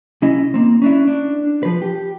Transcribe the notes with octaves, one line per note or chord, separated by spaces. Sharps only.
C2 C#4 E4 D#5
A#3 C4
C#4 D4 E4
D4
F3 B4
G4